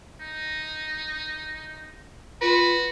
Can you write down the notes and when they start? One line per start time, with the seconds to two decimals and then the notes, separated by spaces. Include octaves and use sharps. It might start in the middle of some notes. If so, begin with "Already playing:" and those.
0.21 D#4
2.42 F4 F#4 B4